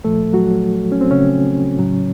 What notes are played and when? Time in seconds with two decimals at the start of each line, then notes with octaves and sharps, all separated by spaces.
0.04 A#2 F3 A3 A4
0.33 F#3 F#4
0.92 C#4
1.01 C4
1.11 C#3 C#4
1.77 A2 F#3